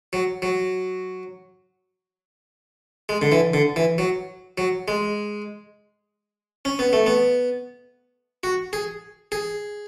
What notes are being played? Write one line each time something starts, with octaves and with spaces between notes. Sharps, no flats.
F#3
F#3
G#3
D3
E3
D3
E3
F#3
F#3
G#3
C#4
B3
A3
B3
F#4
G#4
G#4